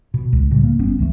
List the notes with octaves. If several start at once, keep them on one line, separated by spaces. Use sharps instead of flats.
B2
C#2
A2 C#3 G3
A#3
G1 G2 B3 C#4
C#2 E3 A3